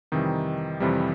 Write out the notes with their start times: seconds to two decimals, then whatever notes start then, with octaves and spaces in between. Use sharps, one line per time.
0.12 F2 C3 D#3 E3 G3 D#4
0.80 F2 C3 E3 G3